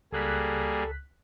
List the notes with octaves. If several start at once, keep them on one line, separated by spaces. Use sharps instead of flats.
C#2 G3 A#3 G#4 A4 F#6 B6